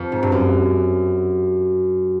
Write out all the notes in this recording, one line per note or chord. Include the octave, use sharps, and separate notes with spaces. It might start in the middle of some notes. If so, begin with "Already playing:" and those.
Already playing: F2
G#2
G2
F#2